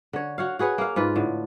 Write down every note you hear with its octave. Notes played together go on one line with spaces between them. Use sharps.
D3 C#5
F#4 C#5 F5
F#4 G#4 B4 C#5
A#3 F5
G#2 F4 B4
A2 D3